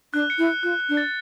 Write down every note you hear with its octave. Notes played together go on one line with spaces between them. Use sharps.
D4 F#6
C#7
E4
F#6
F4 F#6
F#6
D4
A6